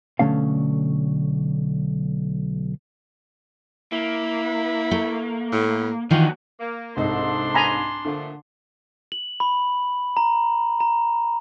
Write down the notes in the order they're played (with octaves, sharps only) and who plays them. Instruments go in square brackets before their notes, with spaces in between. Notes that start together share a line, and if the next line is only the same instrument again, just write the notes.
[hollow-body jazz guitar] B1 F#2 D3 A3 C#4 F5
[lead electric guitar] A#3 [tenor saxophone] E4
[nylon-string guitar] A3
[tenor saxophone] A2
[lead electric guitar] D#2 F#4 [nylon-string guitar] D#3 E3 [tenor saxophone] F4
[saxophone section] A#3
[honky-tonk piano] C2 G#2 D#5 [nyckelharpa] D4 C6 [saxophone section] A4 C5
[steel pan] G#5 A#5 B5
[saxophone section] A#2 F3 A3 [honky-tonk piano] D3
[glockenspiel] F#7
B5
A#5
A#5